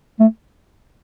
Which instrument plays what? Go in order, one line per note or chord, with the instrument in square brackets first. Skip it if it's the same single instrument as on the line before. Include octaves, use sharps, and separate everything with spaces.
[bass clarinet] A3